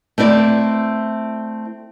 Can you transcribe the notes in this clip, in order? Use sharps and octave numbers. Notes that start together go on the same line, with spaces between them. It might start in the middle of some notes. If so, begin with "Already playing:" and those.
A3 C4 E4 D5